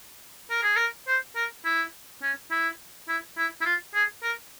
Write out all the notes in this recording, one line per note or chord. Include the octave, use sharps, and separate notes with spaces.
A#4
G#4
A#4
C5
A#4
E4
C#4
E4
E4
E4
E4
F4
G#4
A#4